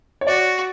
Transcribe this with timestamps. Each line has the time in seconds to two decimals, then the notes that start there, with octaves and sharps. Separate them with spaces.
0.21 C#5
0.27 F#4 D5